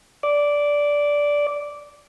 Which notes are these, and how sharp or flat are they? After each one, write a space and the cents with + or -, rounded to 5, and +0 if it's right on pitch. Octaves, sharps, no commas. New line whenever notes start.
D5 -10